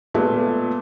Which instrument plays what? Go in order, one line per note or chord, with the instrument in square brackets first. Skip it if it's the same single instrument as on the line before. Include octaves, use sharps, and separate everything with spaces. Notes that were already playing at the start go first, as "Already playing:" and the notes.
[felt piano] A#2 G#3 A3 B3